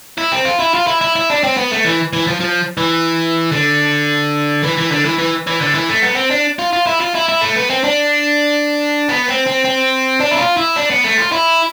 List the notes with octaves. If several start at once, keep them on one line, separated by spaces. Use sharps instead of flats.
E4
C4
F4
E4
F4
E4
E4
E4
D4
C4
B3
A3
E3
E3
F3
F3
E3
D3
E3
E3
D3
E3
E3
E3
D3
E3
A3
B3
C4
D4
F4
F4
E4
F4
E4
E4
A3
B3
C4
D4
B3
C4
C4
C4
D4
E4
F4
E4
D4
B3
A3
F4
E4